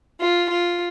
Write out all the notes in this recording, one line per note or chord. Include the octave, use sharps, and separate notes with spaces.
F4
F4